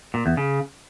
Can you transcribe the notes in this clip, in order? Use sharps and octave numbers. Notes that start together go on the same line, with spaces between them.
A#2
E2
C#3